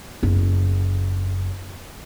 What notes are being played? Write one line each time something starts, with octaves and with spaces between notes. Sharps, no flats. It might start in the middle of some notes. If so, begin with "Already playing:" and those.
F#1 E4